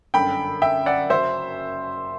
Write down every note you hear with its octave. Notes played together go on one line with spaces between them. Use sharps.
G1 F#2 D3 G5 B5
E5 G5
D5 F#5
F#1 F#2 F#3 C5 E5